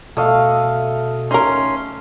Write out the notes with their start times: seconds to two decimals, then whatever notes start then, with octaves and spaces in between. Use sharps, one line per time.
0.17 B2 A3 D#5 F5
1.31 C#4 D#4 A#4 C6